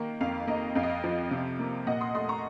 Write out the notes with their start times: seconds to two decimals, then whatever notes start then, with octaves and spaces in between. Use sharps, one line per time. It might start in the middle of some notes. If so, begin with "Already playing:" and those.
Already playing: D#3 A#3
0.21 F2 F5
0.47 A#3 D#5
0.75 F2 F5
0.83 D#5
0.90 F5
1.04 F3
1.31 C3
1.59 A#3
1.87 A#2 D#5 F#5
2.01 C6 D#6
2.15 A3 C6 D#6
2.29 A#5 C#6